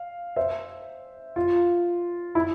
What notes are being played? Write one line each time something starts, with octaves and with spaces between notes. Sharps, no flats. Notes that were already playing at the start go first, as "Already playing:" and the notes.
Already playing: F5
C5 E5
F4
E4